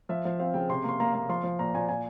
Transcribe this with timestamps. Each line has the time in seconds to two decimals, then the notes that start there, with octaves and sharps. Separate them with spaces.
0.09 F3 E5
0.25 F3 F5
0.39 C4 F5
0.54 C#3 G5
0.69 C3 C6
0.84 A#3 C6
1.00 A#3 A#5
1.14 A#3
1.29 F3 C6
1.44 F3
1.59 A#2 A#5
1.75 A#2 G#5
1.89 A#2 G#5